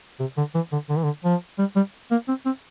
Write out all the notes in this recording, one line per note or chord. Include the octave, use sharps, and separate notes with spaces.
C3
D3
E3
D3
D3
E3
D3
F3
G3
G3
A#3
C4
C4